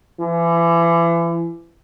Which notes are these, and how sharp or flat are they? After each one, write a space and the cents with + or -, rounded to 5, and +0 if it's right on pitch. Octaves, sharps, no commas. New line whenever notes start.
E3 +35